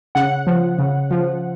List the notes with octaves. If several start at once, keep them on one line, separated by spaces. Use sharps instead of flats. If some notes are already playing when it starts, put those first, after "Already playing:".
C#3 F#5
F3
C#3
F3